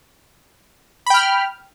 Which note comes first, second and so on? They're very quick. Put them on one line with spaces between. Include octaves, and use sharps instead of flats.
B5 G5 F6